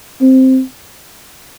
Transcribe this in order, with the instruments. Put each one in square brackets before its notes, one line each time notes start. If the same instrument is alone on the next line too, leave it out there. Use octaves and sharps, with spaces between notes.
[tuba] C4